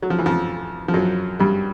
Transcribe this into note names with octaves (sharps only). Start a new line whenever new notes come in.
F#3
F3
E3
F2 F3
F3
F#2 F#3
G2 G3